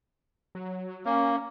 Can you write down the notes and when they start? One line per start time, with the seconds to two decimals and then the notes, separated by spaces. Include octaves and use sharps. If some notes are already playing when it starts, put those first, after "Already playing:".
0.55 F#3
1.06 A#3 C#4